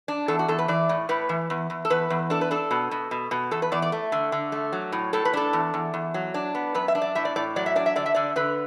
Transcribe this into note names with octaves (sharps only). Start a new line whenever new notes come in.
D4
E2 A4
F#4
E2 A4
B4
E3 D5
A2
A2 B4
E3
E2
E2
A4
E2 B4
E2
D4 A4
B4
D4 A4
B2
B2
B2
B2
E2 A4
B4
E2 D5
D5
A3
D3
D3
A3
F#3
A2
A2 A4
B4
D4 A4
E2
E2
E2
F#3
D4
B3
F#2 B4
E5
D4
D5
A2 E5
D5
A2 D5
F#3 D5
E5
D4 D5
E5
D3 D5
E5
D3 D5
D3 B4